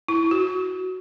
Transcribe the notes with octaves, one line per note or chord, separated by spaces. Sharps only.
E4
F#4